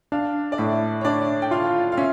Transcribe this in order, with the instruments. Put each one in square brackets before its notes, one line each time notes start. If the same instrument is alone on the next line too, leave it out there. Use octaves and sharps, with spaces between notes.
[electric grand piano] D4 [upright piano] F5
[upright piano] D5
[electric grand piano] A2 [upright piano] E5
[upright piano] C#5
[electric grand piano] D4 [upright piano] D5
[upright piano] G5
[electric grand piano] F4 [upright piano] F5
[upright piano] F5
[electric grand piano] C#4 [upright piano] E5